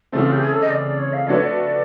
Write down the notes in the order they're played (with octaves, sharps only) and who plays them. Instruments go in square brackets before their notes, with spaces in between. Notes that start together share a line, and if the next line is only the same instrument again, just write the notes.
[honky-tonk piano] C#3 E3 A3 C4 [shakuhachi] F#4
[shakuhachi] F4
G4
G#4
A4
D#5
D5
C#5
F5
[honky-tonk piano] F3 A3 D4 F#4 B4 [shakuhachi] C#5
[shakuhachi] D5